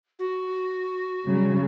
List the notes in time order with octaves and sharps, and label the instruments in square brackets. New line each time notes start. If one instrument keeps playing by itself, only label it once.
[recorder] F#4
[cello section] C#3 F#3 G3